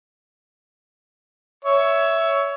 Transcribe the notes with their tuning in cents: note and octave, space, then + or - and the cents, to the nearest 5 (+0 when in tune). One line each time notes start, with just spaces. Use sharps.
C#5 +15 E5 +0